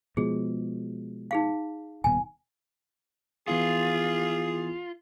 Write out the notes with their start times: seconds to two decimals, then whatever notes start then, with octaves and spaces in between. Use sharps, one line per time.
0.17 B2 F3 G#3 G#4
1.31 D#4 G#4 F5
2.04 D#1 B2 G#5
3.48 E3 B3 E4 F4 G#4